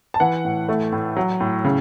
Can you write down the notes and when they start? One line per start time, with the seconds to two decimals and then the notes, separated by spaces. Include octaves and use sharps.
0.14 A5
0.20 E3 F#5
0.45 A2
0.69 A3
0.92 A2
1.17 F#3
1.40 A2
1.64 C#3